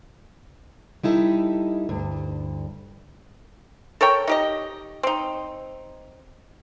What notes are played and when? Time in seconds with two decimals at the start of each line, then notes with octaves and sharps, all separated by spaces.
1.03 G3 D#4 E4 A4
1.89 D2 G2
4.01 A4 A#4 C#5 G5
4.27 D#4 G4 D#5
5.03 C4 D#4